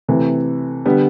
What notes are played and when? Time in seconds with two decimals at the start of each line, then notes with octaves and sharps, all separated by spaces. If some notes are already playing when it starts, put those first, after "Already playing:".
0.08 C3 E3 A3
0.86 D3 G3 B3